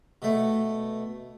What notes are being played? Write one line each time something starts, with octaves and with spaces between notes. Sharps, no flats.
B2 A3